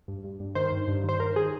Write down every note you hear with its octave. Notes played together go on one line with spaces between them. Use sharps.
G2
G2
G2
D#3 C5
G2
G2
D#3 C5
D#3 A#4
D#3 G#4